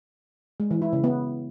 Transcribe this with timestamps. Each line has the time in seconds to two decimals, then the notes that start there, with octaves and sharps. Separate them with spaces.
0.60 G#3
0.71 E3
0.82 E4
0.93 C#3
1.04 B3